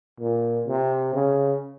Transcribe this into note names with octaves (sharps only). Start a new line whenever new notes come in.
A#2
C3
C#3